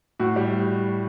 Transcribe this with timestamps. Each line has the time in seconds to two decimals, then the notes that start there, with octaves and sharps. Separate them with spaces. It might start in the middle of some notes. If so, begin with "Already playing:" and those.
0.19 A2 F#4
0.36 G3